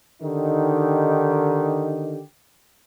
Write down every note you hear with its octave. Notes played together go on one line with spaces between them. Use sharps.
D3 D#3 D#4 G4